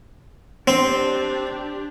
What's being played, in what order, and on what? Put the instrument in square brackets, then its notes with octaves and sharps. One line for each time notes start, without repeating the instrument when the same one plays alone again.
[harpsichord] C4 [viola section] D4 G4